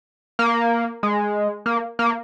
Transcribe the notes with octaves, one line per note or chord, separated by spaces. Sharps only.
A#3
G#3
A#3
A#3